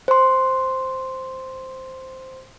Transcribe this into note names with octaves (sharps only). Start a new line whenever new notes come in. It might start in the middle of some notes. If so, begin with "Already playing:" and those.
C5 C6